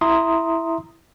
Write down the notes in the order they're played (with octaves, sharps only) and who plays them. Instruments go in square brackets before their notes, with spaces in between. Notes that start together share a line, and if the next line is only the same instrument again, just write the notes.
[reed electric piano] E4 E5 A#5 C6 D#6